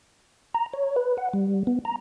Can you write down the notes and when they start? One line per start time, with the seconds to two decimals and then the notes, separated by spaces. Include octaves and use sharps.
0.54 A#5
0.73 C#5
0.96 B4
1.18 F#5
1.33 G3
1.67 B3
1.85 A#5